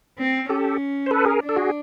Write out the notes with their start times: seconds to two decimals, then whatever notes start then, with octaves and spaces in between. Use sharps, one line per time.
0.18 C4
0.49 C#4 G4 A4
1.06 C5
1.11 A4 B4
1.26 G#4 A#4
1.42 D4
1.49 A4
1.56 F#4 G#4